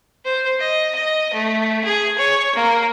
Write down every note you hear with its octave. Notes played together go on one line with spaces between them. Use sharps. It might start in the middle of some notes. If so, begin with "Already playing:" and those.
C5
D#5
D#5
A3
G#4
C#5
A#3